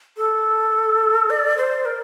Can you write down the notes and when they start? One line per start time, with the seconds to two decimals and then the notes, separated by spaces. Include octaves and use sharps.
0.17 A4
1.30 D5
1.57 C5
1.85 A#4